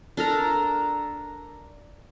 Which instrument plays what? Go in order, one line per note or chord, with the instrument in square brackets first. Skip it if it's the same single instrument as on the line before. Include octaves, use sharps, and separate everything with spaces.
[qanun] D4 A4 A#4 A#5